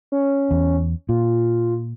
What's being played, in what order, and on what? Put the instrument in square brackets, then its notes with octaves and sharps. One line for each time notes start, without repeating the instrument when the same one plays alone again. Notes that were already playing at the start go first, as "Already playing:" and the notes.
[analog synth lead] C#4
[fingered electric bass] E2
[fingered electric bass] A#2 [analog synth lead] F4